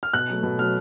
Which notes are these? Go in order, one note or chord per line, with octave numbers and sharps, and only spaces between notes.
F6
B2 F#6
F#3 A3
B2
F#3 A3 F6